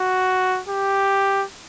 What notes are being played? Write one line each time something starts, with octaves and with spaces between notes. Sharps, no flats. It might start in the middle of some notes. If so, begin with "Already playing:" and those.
Already playing: F#4
G4